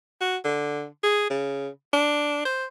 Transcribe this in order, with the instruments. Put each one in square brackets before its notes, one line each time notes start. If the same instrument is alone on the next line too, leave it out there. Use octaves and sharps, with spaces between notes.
[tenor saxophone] F#4
D3
G#4
C#3
D4
C5